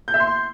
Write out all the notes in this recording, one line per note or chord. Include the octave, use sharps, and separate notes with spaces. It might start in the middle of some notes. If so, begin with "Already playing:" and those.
G6
E5
C6